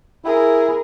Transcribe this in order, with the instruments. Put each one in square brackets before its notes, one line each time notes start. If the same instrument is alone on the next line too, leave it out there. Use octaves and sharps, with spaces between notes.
[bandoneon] E4 [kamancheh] G#4 A#4